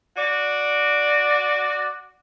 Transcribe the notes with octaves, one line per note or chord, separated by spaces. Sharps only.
F#4 D5